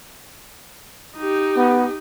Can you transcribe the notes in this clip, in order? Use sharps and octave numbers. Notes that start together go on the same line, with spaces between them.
D#4 G4
B3